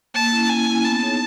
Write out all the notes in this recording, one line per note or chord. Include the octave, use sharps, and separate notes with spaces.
A#3 A5
C#4 E4
A#3 G#5
C#4 E4
B3 A5
D#4 G#4 C#5